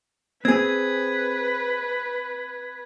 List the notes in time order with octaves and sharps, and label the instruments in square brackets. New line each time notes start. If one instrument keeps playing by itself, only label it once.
[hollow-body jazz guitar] C4 G#4 [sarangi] B4 [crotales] G#6